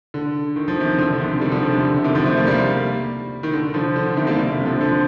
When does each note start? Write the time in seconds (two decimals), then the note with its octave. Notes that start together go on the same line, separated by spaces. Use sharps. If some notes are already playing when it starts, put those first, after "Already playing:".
0.14 D3
0.56 D#3
0.68 F3
0.79 C3 D#3
0.98 D3 F3
1.13 D3
1.20 C3 D#3
1.41 D#3 G3
1.51 D3 F3
1.63 D3
1.72 C3
1.83 D3
1.94 D3
2.04 C3 D#3
2.15 D3 F3
2.25 F3 A3
2.37 G3 A#3
2.47 G3 A#3
3.43 D#3
3.53 D3
3.74 D3 F3
3.96 D3
4.06 D3
4.17 C3 D#3
4.27 G3 A#3
4.38 D3
4.52 C3
4.65 D3 F3
4.81 D3 F3